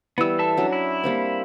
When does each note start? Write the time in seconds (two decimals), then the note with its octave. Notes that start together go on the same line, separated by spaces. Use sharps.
0.18 E3 G3 B3 E6
0.38 A4 E5 A5
0.57 F#3 C#4 D4
0.73 E4
1.04 G3 A#3 C4